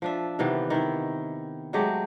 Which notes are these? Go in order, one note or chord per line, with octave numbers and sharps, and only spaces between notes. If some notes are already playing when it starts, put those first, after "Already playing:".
F3 D4 E5
C3 D#3 E3 B3
D#3 E4
F#3 G#3 A3 G4